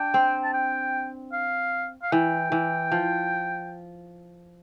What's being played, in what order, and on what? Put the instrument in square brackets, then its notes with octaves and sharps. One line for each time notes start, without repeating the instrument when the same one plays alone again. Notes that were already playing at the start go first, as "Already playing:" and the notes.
Already playing: [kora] D4 [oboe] G5
[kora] C4
[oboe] A5
G5
F5
F5
[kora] E3 [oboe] G5
[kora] E3
F3